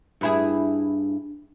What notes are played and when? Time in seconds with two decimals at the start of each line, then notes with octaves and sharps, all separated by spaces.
0.21 G2 E4 G#4